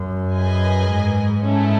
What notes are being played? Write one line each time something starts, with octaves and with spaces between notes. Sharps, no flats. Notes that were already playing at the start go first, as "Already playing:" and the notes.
Already playing: F#2
G#4 B4 D#5 G#5
G#2
A3 C#4 E4